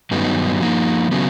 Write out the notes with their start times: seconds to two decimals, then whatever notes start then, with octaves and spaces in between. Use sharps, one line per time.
0.11 G2 D#3 F#3 B3 D#4
0.61 F3 A#3 D#4
1.11 C#3 F#3 B3